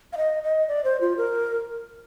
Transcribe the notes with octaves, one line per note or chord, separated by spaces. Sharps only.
F5
D#5
D#5
D5
C5
F4
A#4